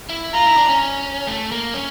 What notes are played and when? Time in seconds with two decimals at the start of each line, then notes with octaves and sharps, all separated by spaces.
0.10 E4
0.34 F4 A#5
0.46 E4
0.57 D4
0.69 C#4
1.27 A3
1.52 A#3
1.74 C#4